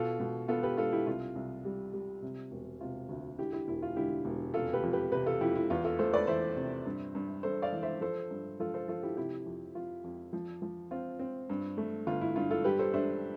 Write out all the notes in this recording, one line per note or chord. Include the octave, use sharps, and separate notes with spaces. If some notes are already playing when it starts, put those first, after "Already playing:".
Already playing: B2 F4 A4
B2
B3 F4 A4
G4 B4
D4 F4 A4
E4 G4
C2 F4
C2
G3
G3
C3
E1
C3 F4
D2
D3 E4 G4
E4 G4
E1 E4
F4
D3 E4 G4
E1
F1 F4 A4
G4 B4
F2
G4 B4
C3 G4 B4
F4 A4
F2 E4 G4
E4
E2 F4
F4 A4
A3 A4 C5
B4 D5
E3 C5 E5
C3
G2
G2
G2 A4 C5
D5 F5
E3
C5 E5
F3 A4 C5
G2
F3 F4 A4
A4 C5
F3 F4 A4
E4 G4
C3 E4 G4
F2
F2 F4
F2
F3
F3
C4 F4
C4
G2
A3
G1 F4
E4
G2 F4
F4 A4
G3 G4 B4
A4 C5
D4 C5 E5